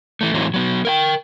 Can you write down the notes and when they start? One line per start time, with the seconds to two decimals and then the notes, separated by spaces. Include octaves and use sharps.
0.21 E3 A3
0.34 A2 E3 F#3 G#3 C4 D#4
0.54 F#3 B3 F#4
0.85 A#4 F5 G5